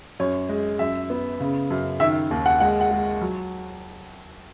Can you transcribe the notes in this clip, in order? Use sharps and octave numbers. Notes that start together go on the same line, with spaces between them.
F#2 C#5
G#3
F#2 E5
B3
C#3
F#2
D#3 E5
D#2
F#5
G#3 F#5
F#5
G#3
F#3